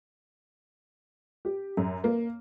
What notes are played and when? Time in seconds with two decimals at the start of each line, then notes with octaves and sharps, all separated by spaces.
1.45 G4
1.77 F#2
2.04 A#3